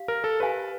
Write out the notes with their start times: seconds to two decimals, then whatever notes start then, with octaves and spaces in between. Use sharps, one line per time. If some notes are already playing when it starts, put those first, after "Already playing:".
Already playing: G4 F5
0.08 A#4
0.24 A4
0.40 G4 B4 C5 F5 G#5